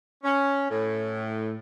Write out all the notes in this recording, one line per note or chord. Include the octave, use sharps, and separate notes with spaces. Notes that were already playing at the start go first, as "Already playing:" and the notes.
C#4
A2